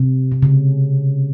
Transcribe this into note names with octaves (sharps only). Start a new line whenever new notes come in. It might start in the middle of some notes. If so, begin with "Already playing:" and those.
Already playing: C3
C3
C#3